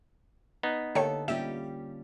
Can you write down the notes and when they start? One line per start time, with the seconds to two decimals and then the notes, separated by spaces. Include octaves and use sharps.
0.63 B3 D#4
0.95 D3 A#3 G4 A4 C#5
1.28 G3 A#3 C#4 F4 G4 E5